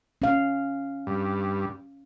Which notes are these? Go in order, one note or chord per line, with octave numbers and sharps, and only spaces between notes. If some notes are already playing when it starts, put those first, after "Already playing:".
C#4 F5
G2